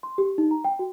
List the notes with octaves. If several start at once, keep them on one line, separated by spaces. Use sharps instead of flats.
C6
G4
D#4
A#5
G5
F#4